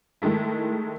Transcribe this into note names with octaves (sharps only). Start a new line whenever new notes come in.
D#3 G#3 A3 E4